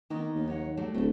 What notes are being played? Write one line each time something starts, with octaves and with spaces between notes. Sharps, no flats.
D#3 A#3 B3 D#5
D#2
F#3 C#5 F#5
F#3 G3 A3
D1 F#3 A3